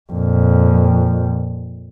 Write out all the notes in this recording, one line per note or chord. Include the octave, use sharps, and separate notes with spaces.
F2 A#2